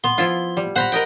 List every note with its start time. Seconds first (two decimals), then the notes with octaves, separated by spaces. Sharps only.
0.04 B3 C6
0.18 F3 E4 F4
0.57 G3
0.76 C5 F#5 A#5 B5
0.92 A#4 D#5 G5